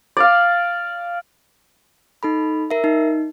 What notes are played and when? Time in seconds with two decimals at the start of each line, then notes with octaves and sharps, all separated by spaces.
0.17 D5 F5
2.23 D#4 A4 B5
2.71 A#4 E5
2.84 D#4